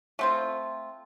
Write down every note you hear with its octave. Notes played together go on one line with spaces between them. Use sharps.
A3 C4 F4